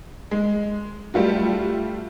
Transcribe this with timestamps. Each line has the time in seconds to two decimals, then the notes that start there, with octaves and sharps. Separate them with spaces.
0.31 G#3
1.14 G3 A3 F4 F#4